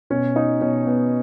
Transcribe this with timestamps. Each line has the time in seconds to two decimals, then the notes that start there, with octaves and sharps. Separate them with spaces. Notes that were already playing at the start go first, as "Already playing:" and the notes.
0.10 B2 C#4
0.36 D#4
0.61 B2 C#4
0.87 B3